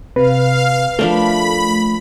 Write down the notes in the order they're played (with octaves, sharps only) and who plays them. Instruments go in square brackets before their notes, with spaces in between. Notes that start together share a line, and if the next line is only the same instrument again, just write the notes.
[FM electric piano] C3 [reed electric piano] B4 [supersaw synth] F5
[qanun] F3 D4 A#4 [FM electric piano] A3 [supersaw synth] B5